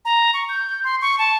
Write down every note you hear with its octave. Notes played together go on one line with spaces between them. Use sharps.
A#5
C#6
G6
C6
C#6
A5